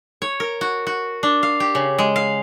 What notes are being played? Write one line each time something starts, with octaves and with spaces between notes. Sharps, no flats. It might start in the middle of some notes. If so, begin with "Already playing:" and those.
C#5
A#4
F#4
F#4
D4
F5
G4
C#3
G#3
F5